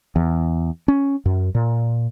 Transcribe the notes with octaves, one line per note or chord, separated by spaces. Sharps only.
E2
C#4
F#2
A#2